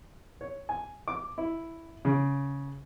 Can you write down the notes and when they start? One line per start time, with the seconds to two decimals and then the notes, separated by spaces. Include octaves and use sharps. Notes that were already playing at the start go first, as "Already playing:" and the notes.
0.41 C#5
0.69 G#5
1.08 D6
1.38 E4
2.05 C#3